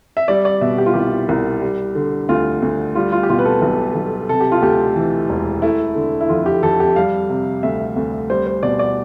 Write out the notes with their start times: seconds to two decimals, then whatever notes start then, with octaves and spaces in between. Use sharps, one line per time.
0.17 E5
0.28 G3 D5
0.45 D5
0.61 B2 E5
0.78 G4
0.86 F4
0.94 C2 G4
1.29 C2
1.62 G3
1.95 D3
2.29 D2 F4
2.62 D2
2.95 G3 F4
3.12 F4
3.23 G4
3.29 B2 F4
3.39 B4
3.45 A4
3.62 B1
3.95 B1
4.29 C3 A4
4.40 G4
4.52 F4
4.62 D2 G4
4.96 E3
5.29 E1
5.62 A3 E4
5.95 D3
6.21 E4
6.29 F2 F4
6.46 G4
6.63 F2 A4
6.80 G4
6.96 G3 F5
7.29 C3
7.63 D2 E5
7.96 D2
8.30 G3 C5
8.47 C5
8.63 B2 D5
8.79 D5